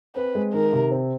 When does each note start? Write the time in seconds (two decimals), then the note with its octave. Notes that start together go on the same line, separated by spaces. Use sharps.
0.16 C4 B4
0.35 G#3
0.53 D#3 A#4
0.73 C3
0.91 C4